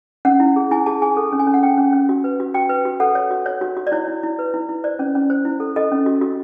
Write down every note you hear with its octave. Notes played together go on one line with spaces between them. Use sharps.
C#4 F#5
E4
G#4
E4 G#5
G#4 A5
G#4 G#5
A4
C#4
G#5
C#4
F#5
C#4 G5
C#4
C#4
F#4
B4
F#4
F#4 G5
B4
F#4
A4 F#5
C#5
F#4
C#5
F#4
F#4
D5
E4 C#5
E4
E4
B4
E4
E4
C5 D5
C#4
C#4
C5
E4
A4
A4 D#5
C#4
F#4
F#4